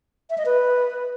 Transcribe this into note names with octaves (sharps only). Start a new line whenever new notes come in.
E5
D#5
B4